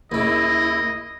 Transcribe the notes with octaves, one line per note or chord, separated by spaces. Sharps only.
D#2 C#3 E4 D#5